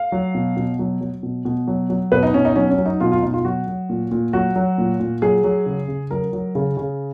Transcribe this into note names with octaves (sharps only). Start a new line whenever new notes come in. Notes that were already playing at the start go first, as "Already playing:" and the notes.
Already playing: F5
F#3
B2
B2
F#3
F#3
B2
B2
F#3
F#3
B2 B4
D#4
B2 C#4
D#4
F#3 C#4
C#4
F#3
D#4
B2 F4
F4
B2 D#4
F4
F#3 F#4
F#3
A#2
A#2
F#3 F#4
F#3
A#2
A#2
F#3 G#4
F#3
C#3
C#3
F#3 A#4
F#3
C#3
C#3